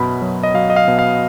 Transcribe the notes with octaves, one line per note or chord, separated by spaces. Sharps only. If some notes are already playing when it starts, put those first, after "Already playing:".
Already playing: F#2 B2 B5
F#3
D#5
F#3 F5
D#5
F5
B2
F5